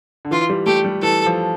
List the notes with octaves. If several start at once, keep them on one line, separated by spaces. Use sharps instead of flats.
D3
E3 F4
G3
A3 G4
G3
E3 A4
F3